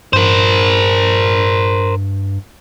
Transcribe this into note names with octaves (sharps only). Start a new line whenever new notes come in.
G2 A#4 C5